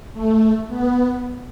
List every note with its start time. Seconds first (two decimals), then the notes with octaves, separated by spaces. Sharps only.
0.13 A3
0.68 B3